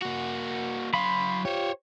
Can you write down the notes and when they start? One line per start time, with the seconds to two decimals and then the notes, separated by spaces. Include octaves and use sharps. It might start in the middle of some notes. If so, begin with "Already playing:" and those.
0.02 A#3 F#4
0.94 F#3 F5 B5 C6
1.45 F4 G4 C5 C#5